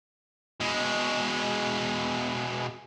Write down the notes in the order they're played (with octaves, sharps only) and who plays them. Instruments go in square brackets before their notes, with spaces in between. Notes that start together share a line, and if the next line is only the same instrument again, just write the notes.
[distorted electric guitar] B2 G#3